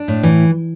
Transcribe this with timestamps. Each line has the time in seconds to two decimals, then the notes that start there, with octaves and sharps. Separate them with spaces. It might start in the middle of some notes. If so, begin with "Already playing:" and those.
Already playing: D4
0.08 A2
0.23 E3